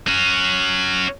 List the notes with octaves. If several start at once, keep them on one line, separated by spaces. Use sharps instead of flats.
C#4 F#4